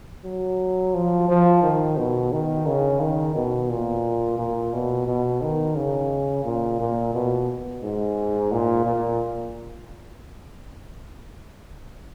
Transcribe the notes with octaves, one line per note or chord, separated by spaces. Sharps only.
F#3
F3
F3
D#3
B2
D#3
C#3
D#3
B2
A#2
A#2
B2
B2
D#3
C#3
A#2
A#2
B2
G#2
A#2
A#2